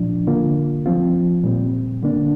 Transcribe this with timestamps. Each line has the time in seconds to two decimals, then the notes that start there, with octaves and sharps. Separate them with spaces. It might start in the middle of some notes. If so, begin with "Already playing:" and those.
Already playing: A#2 F3 D4
0.27 D3 A#3 F4
0.86 F3 C4 F4
1.44 A#2 G3 C4
2.03 D3 A#3 D4